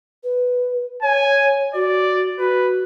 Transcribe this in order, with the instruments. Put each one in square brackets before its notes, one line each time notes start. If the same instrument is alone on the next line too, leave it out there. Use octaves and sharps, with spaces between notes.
[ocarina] B4
[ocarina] C#5 [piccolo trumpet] G#5
[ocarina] F#4 [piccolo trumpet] D5
[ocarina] F#4 [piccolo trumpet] B4